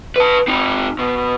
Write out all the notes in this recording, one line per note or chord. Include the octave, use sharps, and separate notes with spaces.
B4 A5
C4 D#4
B2